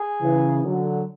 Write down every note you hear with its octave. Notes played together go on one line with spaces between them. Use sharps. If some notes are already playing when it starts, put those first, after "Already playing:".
Already playing: G#4
C#3 E3
D3 F#3